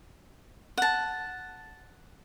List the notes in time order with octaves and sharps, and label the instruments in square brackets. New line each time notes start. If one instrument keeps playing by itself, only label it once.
[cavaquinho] F#5 A5